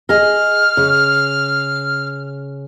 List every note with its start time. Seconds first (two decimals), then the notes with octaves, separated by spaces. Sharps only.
0.09 G#4 D#5 F6
0.77 C#3